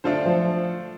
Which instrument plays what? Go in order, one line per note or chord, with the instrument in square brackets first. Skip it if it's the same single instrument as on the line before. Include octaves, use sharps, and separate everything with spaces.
[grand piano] D3 [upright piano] A3 D4 F4 A4 C5
[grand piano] F3